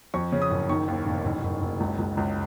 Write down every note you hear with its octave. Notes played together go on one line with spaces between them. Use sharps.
F2 C#6
C#3
D#6
F#1
D#3 C#6
D#2
F1
F#1
F#1
F#1
C#2
C#2
C#2